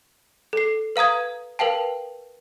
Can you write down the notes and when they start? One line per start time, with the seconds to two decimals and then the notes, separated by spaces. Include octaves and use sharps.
0.53 A4 C7
0.96 B4 F5 A#5 D#6 G#6
1.59 A#4 B4 F5 G5 A5